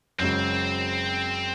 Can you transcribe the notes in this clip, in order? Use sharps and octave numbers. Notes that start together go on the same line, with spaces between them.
F#1 F#2 C#3 G#3 C4